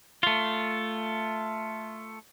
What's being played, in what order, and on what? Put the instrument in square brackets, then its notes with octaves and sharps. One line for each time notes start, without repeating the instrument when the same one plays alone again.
[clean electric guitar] A3 F4